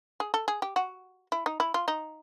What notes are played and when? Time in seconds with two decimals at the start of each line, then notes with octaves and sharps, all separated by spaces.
0.20 G#4
0.34 A4
0.48 G#4
0.62 G4
0.76 F#4
1.32 E4
1.46 D#4
1.60 E4
1.74 F4
1.88 D#4